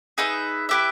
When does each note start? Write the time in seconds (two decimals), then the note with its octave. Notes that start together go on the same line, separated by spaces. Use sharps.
0.18 D#4 G#4 B4 E5
0.69 E4 G4 B4 E5